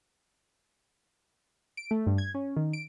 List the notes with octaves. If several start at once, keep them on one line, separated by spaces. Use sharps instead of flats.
D7
A3
G2
G#6
C#4
D#3
D7